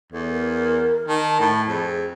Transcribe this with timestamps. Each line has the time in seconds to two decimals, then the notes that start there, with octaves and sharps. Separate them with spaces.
0.12 E2 A4
0.31 A#4
1.08 D#3 A5
1.40 A2
1.68 F2 G#4
1.85 G#4